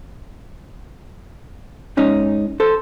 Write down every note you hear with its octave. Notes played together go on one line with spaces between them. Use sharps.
G#2 C#4 D#4
A4 C5